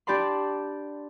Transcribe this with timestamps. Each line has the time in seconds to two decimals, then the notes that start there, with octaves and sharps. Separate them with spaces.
0.07 D4 G4 D5 A5 B5 C6